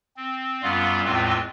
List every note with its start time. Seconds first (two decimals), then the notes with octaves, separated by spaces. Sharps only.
0.17 C4
0.63 F#2 G3 B3 F4 F5
1.05 E2 A2 G#3 C4 F4 B4